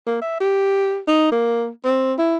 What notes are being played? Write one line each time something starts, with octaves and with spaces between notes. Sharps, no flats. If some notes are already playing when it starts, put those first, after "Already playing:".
A#3
E5
G4
D#4
A#3
C4
E4